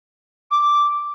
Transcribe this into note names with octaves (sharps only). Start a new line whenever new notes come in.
D6